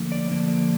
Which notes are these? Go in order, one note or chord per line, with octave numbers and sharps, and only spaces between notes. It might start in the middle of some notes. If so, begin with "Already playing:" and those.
Already playing: D3 F3 A#3
D5
D3 F3 A#3